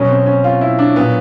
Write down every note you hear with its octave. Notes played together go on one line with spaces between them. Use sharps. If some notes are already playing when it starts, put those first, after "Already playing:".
Already playing: B2 F#3 C#4
C4
C#4
F4
E4
D4
A#2 F#3 B3